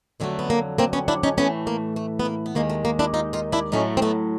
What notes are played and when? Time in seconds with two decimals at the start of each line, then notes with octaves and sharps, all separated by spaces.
0.20 F2 D3 F#3 A3 A#3
0.39 B3
0.50 A#3
0.78 A#3 C4
0.93 B3 C#4
1.08 D4 E4
1.23 C#4 D#4
1.37 A2 E3 A3 B3 C#4
1.67 A#3
1.96 A3
2.19 B3
2.25 A#3
2.46 B3
2.55 D#2 D#3 G#3 A#3
2.70 A3
2.85 A#3
2.99 D4 E4
3.14 D#4 F4
3.33 D#4 F4
3.52 D4 E4
3.72 A2 F#3 A3 C#4 D#4
3.97 C4
4.02 A3 B3